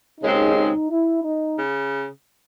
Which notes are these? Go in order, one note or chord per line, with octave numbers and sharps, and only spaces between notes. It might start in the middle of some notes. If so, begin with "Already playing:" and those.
D#2 C#3 G#3 C4 D#4
D#4
E4
D#4
C#3